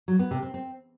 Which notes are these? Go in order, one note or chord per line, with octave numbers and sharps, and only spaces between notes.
F#3
B3
C3
C4
C4